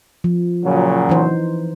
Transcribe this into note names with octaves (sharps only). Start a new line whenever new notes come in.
F3
A#2 C#3 F#3
E3 D#4 C5